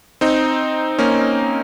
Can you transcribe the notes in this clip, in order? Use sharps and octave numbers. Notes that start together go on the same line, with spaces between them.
C4 D#4
A#3 C#4